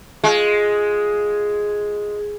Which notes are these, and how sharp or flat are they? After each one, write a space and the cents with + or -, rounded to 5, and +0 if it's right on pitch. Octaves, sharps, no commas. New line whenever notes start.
G#3 +0 F4 +0